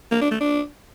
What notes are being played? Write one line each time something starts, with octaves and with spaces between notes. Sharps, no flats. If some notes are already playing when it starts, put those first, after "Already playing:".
A#3
D4
A3
D4